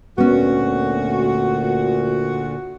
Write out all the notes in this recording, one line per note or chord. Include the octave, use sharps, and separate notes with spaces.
D2 A#2 B3 C#4 F#4